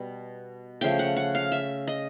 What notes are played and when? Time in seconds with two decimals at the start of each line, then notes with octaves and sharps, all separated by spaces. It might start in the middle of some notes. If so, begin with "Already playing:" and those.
Already playing: B2 G3
0.81 C#3 F3 A3 G5
0.99 F#5
1.16 F#5
1.35 F5
1.52 E5
1.87 D#5